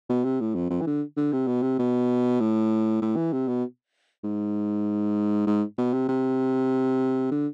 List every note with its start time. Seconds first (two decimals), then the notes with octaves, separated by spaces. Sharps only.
0.09 B2
0.24 C3
0.40 A2
0.55 F2
0.70 F2
0.81 E3
0.86 D3
1.17 D3
1.33 C3
1.47 B2
1.62 C3
1.79 B2
2.40 A2
3.02 A2
3.16 E3
3.33 C3
3.48 B2
4.24 G#2
5.47 G#2
5.78 B2
5.93 C3
6.08 C3
7.31 D3